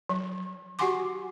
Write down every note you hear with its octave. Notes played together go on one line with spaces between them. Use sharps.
F#3
F#4 G4 F#5 G#5 C6 D6